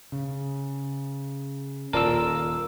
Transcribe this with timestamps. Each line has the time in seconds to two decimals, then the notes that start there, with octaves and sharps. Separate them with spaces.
0.12 C#3
1.93 D#1 F4 A#4 D5 A5 E6